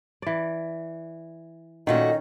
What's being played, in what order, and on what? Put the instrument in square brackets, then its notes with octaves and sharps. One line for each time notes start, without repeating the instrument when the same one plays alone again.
[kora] E3 D5
[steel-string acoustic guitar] A#2 A3 F#4 [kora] D#3 C#4 [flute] D#5